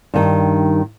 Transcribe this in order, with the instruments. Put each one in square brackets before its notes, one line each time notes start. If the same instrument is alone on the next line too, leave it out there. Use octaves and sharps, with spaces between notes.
[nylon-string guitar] G2 D#3